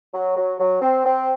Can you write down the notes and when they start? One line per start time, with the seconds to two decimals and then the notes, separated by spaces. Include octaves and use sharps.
0.13 F#3
0.36 F#3
0.60 F#3
0.82 C4
1.05 C4